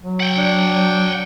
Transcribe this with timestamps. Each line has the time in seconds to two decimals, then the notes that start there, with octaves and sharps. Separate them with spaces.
0.02 F#3
0.20 F#5 G5
0.37 D4